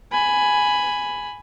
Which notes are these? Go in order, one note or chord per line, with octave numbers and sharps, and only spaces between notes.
G#5 B5